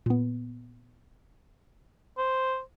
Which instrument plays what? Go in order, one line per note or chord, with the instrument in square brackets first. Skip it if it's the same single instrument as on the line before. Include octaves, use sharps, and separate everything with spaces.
[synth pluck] A#2 B3
[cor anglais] C5